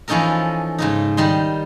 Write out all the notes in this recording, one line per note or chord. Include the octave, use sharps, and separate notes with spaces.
E3 F3 C#4 D#4 A4 A#4
G#2 C#3 D#4
D#3 G3 D#4 C6